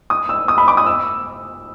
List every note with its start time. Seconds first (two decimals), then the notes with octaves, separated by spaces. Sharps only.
0.10 D#6
0.29 E6
0.48 D#6
0.58 B5
0.68 D6
0.77 D#6
0.86 E6